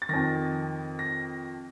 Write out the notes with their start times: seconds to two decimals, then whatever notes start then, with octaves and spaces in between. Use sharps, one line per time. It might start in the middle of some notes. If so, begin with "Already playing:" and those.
0.02 A6
0.09 F2 D#3 A#6
0.99 A#6